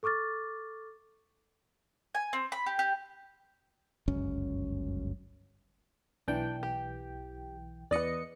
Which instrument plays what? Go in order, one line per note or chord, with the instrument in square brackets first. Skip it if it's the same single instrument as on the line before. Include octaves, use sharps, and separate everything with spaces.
[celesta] A4 C#6 D6 F6 A6
[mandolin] G#5
C4
B5
G4
G4
[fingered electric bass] G1 C#2 F#2 C#4
[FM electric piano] B1 E3 G5 [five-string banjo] D4
[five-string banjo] G4
[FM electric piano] E2 D#5 C#7 [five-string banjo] B4 D5